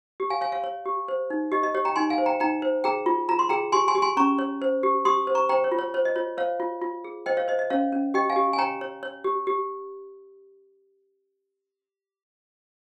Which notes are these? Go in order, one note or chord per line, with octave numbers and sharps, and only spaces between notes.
G4
F5 G#5
C#5 F5 G#5
C#5 F5
C#5
G4
C5
D#4
G4 D#5
D#5
G4 C#5
G5 A#5
D#4 G#5 C6
F5 G#5
C5
G5 A#5
D#4 G5 A#5
C5
G#4 G5 A#5
F4
F4 A#5
C6
G#4 G5 A#5
G4 G#5 C6
G#5 C6
G4
G#5 C6
C#4 A#5 C#6
C#5
C5
G4
G4 C6 D#6
C5
A#5 C#6
C5 G5 A#5
C#5
F4
C#5
C5 C#5
D#5
F4 C#5
C5 C#5 F5
F4
F4
G#4
C5 D#5 G5
C#5 F5
C5 D#5
D#5
C#4 C#5 F5
C#4
G4 D#5 G5
F5 G#5
G4
G#5
C#5 G5 A#5
C#5
C#5
G4
G4